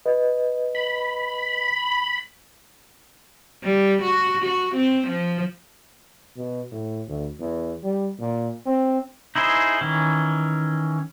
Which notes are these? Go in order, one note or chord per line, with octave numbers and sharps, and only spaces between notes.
B4 D#5
B5
G3
F#4
F#4
C4
F3
B2
A2
D2
E2
G3
A#2
C4
D#4 E4 G#4 C5
D#3 E3 C#4